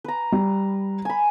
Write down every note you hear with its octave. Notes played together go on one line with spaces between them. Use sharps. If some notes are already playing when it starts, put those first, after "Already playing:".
B4 A#5
G3
G#5 B5